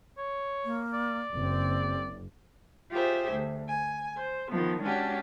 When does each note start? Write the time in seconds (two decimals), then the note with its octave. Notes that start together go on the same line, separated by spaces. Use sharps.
0.18 C#5
0.65 A#3
0.94 D5
1.34 F#1 C4
2.92 F4 G4 G#4 C5 E5
3.32 D2
3.68 G#5
4.17 C5
4.50 D#3 F3 B3
4.82 G#3 C#4 D4 F#4 G4